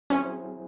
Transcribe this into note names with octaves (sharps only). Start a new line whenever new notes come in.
F#3 C4 C#4 E4 G#4